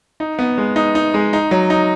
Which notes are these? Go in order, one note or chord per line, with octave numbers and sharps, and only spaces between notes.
D#4
B3
G#3
D#4
D#4
G#3
D#4
F#3
D#4